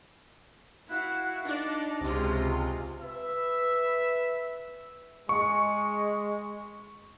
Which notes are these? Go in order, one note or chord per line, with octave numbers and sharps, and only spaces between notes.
E4 F#4 F5 F#6
D4 D#4 D5
C#2 C3 G#3 F4 A#5
B4 E5
G#3 C#6